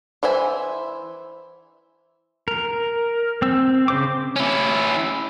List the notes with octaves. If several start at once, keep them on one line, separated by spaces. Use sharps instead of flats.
E3 C5 E5 G#5
A#4
C4 E6
C#3 C5 D6
C#4 E4